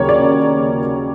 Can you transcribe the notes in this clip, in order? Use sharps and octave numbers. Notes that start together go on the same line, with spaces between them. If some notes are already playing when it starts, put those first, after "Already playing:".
Already playing: D#2 C#3 F#3 A#3 C#5
D5